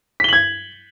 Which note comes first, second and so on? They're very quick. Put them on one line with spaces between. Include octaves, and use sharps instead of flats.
B6 G7 F#7 G#6